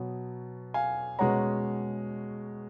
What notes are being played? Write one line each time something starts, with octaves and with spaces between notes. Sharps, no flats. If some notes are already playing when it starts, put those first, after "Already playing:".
Already playing: B2 F#3 B3
F5 G#5
B2 G#3 C#4 F#5 A#5